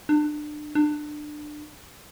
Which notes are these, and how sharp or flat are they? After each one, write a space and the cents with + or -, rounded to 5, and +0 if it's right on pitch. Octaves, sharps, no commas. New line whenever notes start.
D4 +30
D4 +25